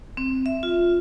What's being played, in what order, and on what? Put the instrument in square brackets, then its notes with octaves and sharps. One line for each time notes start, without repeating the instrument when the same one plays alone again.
[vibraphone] C4
E5
F4